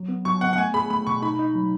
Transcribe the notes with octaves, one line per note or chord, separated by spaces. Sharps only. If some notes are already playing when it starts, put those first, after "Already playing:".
Already playing: F#3
B3
F#3 C#6
B3 F#5
F#5
A3 G#5
G#4 B5
A3 B5
B2 C#6
D#4 B5
D#4
F#3